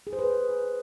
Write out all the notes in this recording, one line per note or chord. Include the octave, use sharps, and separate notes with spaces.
G#4
C5
B4